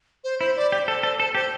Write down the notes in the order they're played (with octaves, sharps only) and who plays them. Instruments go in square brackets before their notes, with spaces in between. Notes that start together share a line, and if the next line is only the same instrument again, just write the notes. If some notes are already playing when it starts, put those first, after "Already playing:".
[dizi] C5
[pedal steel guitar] E4 [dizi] C5
[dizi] D5
[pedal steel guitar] G4 [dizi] D5
[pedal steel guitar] A4 [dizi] C5
[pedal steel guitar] A4 [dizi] C5
[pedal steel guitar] A4 [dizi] C5
[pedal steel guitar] G4 [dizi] C5